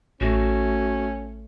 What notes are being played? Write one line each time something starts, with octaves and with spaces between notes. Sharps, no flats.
A1 A3 C#4 F#4